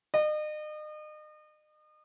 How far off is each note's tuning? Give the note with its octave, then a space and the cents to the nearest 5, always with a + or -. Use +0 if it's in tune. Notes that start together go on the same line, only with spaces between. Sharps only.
D#5 -35